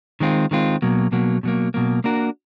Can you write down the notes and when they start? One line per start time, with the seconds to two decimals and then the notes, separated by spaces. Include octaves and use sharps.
0.20 D#3 G#3 C4 F4
0.51 D#3 G#3 C4 F4
0.82 B2 F#3 A#3
1.12 B2 F#3 A#3
1.43 B2 F#3 A#3
1.74 B2 F#3 A#3
2.04 A#3 D4 F#4 A#4